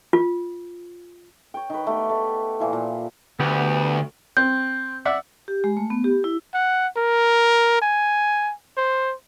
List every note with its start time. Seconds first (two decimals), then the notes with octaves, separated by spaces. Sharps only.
0.13 F4
1.54 C#5 G5
1.70 D#3 B4
1.87 A3 B3 G4
2.09 A3
2.60 A#2 E3 F3
2.73 A#2
3.40 D2 B3 G4 B4
4.37 C4 G6
5.05 D5 E5 F#5
5.48 G4
5.64 G#3
5.77 A3
5.90 B3
6.04 G4
6.24 E4
6.54 F#5
6.97 A#4
7.81 G#5
8.77 C5